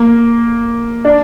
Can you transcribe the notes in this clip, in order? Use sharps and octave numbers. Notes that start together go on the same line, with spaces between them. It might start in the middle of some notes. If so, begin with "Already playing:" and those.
Already playing: A#3
D4